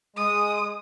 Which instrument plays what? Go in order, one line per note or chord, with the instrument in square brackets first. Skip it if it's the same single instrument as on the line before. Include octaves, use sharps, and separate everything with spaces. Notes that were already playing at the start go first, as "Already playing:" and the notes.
[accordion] G#3 [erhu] D#6